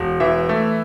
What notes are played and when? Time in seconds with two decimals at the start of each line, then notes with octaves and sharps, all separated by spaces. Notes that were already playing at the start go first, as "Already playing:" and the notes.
Already playing: E1
0.20 E3 E5
0.49 A3